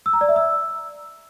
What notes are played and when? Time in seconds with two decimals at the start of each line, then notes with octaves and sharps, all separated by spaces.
0.06 E6
0.13 A#5
0.21 D5
0.29 E5
0.36 E6